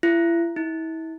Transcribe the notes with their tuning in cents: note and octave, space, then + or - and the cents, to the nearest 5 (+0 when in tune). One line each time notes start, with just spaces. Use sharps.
E4 +35
E4 -35